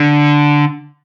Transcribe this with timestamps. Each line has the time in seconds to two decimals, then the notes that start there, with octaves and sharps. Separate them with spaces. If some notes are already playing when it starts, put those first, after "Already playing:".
Already playing: D3